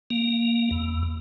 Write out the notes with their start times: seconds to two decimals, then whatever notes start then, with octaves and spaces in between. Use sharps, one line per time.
0.10 A#3
0.71 E2